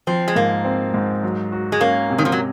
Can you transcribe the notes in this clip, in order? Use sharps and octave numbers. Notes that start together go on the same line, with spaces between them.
F3 C4
G#3
G#2 A#3
C4
G#2
F#3
F#4
G#3
A#3 C#4
C3
D#3
F3
F#3